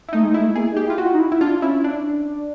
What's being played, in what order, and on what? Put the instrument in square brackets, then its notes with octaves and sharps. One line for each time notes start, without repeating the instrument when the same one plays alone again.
[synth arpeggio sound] E4
[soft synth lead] A3 [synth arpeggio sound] D#4
[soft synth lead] G#3
[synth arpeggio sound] E4
[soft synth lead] A3
[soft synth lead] A#3 [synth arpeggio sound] G#4
[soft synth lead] D#4
[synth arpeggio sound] G4
[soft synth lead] E4
[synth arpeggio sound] F4
F#4
[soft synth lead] F4
D#4
E4
[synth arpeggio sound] E4
[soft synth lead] D4 [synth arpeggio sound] F4
[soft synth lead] C#4 [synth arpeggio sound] E4
[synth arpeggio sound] D4